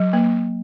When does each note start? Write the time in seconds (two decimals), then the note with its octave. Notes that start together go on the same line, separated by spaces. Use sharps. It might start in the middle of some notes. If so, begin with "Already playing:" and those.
Already playing: F#3
0.13 A#3